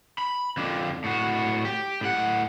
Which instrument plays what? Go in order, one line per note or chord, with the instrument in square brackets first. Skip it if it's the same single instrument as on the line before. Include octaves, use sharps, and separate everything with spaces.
[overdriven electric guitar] B5
F2 D3
A2 F#4
G4
A2 F#5